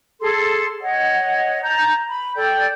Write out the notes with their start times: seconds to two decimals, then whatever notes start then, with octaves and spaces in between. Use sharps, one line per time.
0.21 G#4 A4 C6
0.81 C#5 D#5 F#5
1.62 A5 A#5 G6
2.09 B5
2.35 A4 D5 G5 G6